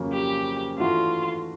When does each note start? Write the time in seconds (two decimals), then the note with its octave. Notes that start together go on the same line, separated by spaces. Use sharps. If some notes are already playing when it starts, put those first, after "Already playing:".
Already playing: F2 C#3 F#3 A#3 C#4
0.12 G4
0.78 E3 A3 D4 F4 F#4